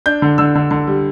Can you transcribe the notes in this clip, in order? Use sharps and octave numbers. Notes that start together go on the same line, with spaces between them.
D4 G6
D3
D3 E6
D3
D3
G3